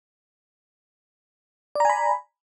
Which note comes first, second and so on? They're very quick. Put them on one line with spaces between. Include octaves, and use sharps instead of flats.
D5 A#5 G#5 B5